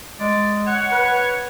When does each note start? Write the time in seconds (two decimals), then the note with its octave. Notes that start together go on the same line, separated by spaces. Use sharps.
0.19 G#3 D5
0.67 C#5 F#5
0.92 B4